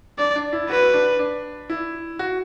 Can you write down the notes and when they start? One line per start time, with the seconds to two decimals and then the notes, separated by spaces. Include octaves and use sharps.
0.18 D4 D5
0.35 D4
0.53 E4
0.69 F#4 B4
0.94 D4
1.19 D4
1.70 E4
2.19 F#4